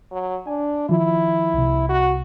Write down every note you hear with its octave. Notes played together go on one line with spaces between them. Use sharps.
F#3
D4 G#5
D#3 F3 E4 F4
C2 C3
F#4